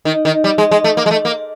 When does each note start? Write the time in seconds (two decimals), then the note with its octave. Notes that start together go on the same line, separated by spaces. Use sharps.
0.05 D#3
0.25 D#3
0.44 G3
0.58 G#3
0.71 G#3
0.84 A3
0.97 A#3
1.06 G#3
1.11 A3
1.25 A#3